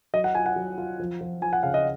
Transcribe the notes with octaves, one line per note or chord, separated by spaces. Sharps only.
F#3 D#5
F#5
F4 G#5
F#5
F#3
F4
F3
F3
F3 G#5
F#5
C#3 F5
D#5